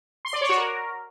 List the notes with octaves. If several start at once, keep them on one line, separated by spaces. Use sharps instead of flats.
C6
D5
C#5
F#4
A#4